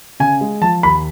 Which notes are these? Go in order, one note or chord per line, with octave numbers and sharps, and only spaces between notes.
C#3 G#5
G#3
F3 A5
D#2 B5